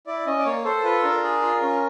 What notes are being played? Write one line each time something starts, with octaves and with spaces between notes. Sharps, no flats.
E4 D5
C#4 D#5
D5
A#3 C#5
A4 C5
F4 B4
D4 A#4
G#4
F4
C#4